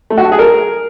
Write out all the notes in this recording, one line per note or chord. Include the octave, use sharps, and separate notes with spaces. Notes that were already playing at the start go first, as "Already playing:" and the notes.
A3
F#4
A4
G#4
A#4